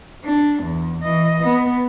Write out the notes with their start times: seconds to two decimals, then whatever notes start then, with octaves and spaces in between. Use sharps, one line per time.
0.25 D4
0.63 E2
1.02 E3 D#5
1.44 B3